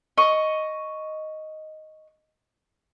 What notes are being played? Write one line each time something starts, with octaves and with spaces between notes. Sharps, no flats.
D#5 C#6